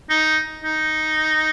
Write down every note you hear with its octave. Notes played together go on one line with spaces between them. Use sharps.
D#4
D#4